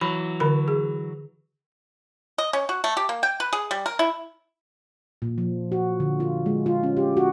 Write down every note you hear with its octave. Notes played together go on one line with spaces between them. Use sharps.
E3 F#3 B5
D3 A#4 B5
G#4
D#5
C#4
F#4
A3
G4
A#3
G5
B4
G#4
G3
A#4
E4
A#2
F3
F#4
D3
F4
G#3
F4
C#4
G4
F#4